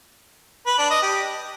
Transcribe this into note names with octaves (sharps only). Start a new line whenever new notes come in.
B4
D4
D#5
G4